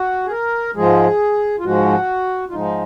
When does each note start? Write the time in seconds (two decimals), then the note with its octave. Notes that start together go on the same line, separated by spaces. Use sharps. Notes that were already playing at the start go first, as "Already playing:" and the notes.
Already playing: F#4
0.26 G#4
0.31 A#4
0.76 G#2 F3 G#3 G#4
1.59 F4
1.64 G#2 F3 G#3 F#4
2.49 F4
2.52 G#2 F3 G#3 D#4